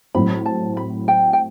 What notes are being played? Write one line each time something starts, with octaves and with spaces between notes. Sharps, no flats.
A2 F#3 C4 B5
A5
B5
G5
G5